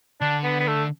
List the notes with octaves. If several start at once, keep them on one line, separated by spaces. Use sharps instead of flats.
D3 D4
B3
B3
A3